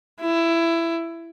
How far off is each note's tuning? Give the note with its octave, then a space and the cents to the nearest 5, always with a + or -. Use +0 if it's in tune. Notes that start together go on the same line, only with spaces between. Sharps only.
E4 +15